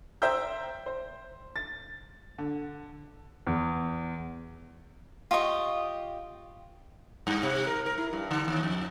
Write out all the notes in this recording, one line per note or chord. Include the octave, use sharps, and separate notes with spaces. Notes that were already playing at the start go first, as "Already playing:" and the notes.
C5 E5 G5 A#5 E6 G6
C5
A6
D3
E2
F4 G4 D#5 C#6
G2
C3
A#4
A#4
E4
G2
D3
D#2
F2